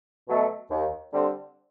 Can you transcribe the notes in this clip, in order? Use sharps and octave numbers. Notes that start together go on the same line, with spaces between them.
B2 F#3 A3
D#2
D3 G3 C4